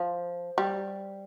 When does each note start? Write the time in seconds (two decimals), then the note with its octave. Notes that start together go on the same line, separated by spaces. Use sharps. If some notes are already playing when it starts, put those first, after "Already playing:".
Already playing: F3
0.58 G3